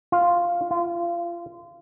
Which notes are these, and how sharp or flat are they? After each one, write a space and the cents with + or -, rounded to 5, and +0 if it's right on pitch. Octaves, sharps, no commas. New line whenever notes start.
F4 +0
F4 -25